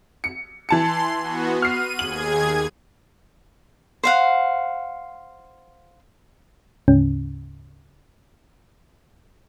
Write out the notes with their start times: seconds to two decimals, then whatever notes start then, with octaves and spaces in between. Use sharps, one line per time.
0.24 C#7
0.69 E3 A5 C6 C#7
1.21 B3 F#4
1.62 F6 C7 D#7
1.99 D#2 G#4 G#6 F#7
4.03 C5 F5 F#5
6.88 D2 G#2 C#3 C#4